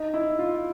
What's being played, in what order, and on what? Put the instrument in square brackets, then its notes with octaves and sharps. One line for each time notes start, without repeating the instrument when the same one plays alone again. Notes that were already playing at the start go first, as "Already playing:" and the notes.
Already playing: [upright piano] D#4
E4
F4